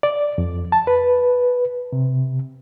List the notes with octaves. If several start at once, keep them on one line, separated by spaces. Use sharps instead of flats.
D5
F2
A5
B4
C3